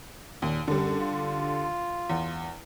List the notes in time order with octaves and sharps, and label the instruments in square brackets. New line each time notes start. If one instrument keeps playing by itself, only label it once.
[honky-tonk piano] D#2 [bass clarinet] A#2
[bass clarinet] F#2 [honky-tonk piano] D3 G3
[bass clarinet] F4
[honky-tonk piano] E2